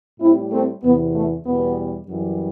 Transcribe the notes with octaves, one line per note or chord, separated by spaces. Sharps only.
A2 G3 C4 E4
A3 C4
E2 C3 E3 B3
A3
E2 B2 G3 B3
F#2 E3 G3